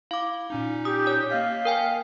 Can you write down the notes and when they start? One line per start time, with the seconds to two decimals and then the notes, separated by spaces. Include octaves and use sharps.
0.11 E4 F5 D6
0.50 A#2 C#4 D#4
0.85 G4 D#6
1.06 C#5 D#6
1.30 A#3 D#5 F5 B6
1.65 A#4 G5 G#5